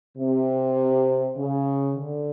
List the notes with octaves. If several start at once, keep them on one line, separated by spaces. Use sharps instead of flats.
C3
C#3
D3